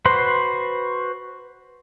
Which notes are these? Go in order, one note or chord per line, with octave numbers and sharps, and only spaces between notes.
F#4 B4 C5 C6